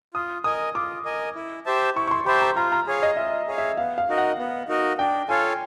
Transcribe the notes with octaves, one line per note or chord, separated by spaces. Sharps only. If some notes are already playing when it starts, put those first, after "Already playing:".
F4 D#6
A#4 D#5 G#5 D#6
F4 D6
A#4 D#5 G#5
E4
G4 C5 E5 A5
E4 C#6
C#6
C6
G4 C5 E5 A5 B5
A#5
F4 A#5
A#5
G#4 C#5 F5
D#5
F4 E5
G#4 C#5 F5
E5
B3 F5
F5
D#4 F#4 A#4 D#5
F#5
B3
D#4 F#4 A#4 D#5
D4 G5
F4 A4 C#5 F5 G#5